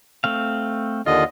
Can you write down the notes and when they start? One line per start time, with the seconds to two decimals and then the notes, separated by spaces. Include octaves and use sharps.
0.24 A3 C4 F5
1.06 D#2 D3 F4 D#5